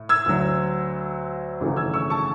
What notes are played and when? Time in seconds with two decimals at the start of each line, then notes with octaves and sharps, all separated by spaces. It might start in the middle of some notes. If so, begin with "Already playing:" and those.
Already playing: A2
0.09 E6 G#6
0.26 D2 D3 F#3
1.60 G#1 F#2 C#3 E3 A3
1.77 E6 G#6
1.94 C#6 E6
2.10 A5 C#6